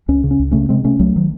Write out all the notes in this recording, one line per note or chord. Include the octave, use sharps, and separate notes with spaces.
C#2 C#4
C#3
C#4
C#2
C#3 A3 C#4
C3 G#3 C4
C3 A3 C#4
C2 F#3 A3
D#3 F#3